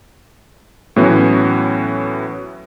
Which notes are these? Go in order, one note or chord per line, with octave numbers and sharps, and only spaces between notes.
A2 E3 F#3 B3 C#4